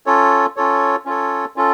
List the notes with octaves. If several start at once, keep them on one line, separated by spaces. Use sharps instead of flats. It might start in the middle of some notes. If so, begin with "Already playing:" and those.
C#4 F4 A4 C#5
C#4 F4 A4 C#5
C#4 F4 A4 C#5
C#4 F4 A4